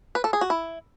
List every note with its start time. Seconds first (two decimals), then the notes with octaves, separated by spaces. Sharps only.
0.15 B4
0.24 A4
0.33 G#4
0.41 F#4
0.50 E4